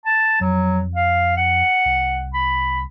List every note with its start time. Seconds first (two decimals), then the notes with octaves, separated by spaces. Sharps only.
0.05 A5
0.41 F2 F#3
0.95 F5
1.37 F#5
1.85 C2
2.34 B5